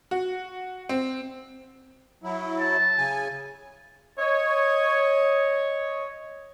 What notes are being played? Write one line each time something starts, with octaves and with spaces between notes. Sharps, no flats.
F#4
C4
F#3 E4
A5
C#3 G#5
C#5 D#5